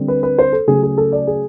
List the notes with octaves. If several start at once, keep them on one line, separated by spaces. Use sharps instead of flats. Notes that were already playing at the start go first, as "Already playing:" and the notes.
Already playing: D3 G3 C4
B4
B4
C5
A4
C#3 F#3 A3 C#4 G#4
G#4
A4
D5
G#4